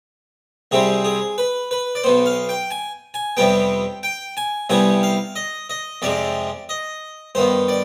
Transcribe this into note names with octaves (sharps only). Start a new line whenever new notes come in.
C2 C3 G3 C4 G#4
G#4
B4
B4
D5
B1 B2 B3 C5
F5
G5
G#5
G#5
F2 C3 G3 B3 G5
G5
G#5
C2 C3 G3 B3 G#5
F5
D#5
D#5
F2 C3 F3 G#3 D5
D#5
G2 D#3 B3 C5
D5